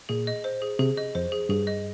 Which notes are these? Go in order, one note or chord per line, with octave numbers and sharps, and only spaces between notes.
A#2 G#4
D#5
C5
G#4
C3 G#4
D#5
F2 C5
G#4
G2 G#4
D#5